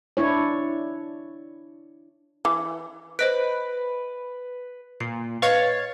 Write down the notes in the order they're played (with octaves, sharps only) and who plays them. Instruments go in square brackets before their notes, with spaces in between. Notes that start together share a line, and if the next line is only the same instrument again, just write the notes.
[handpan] D4 E4 C#5
[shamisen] E3
[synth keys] B4 [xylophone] C5 D#5 D7
[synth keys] A#2 [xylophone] C7
[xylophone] B4 D#5 C#6 [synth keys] C#5 F5 A6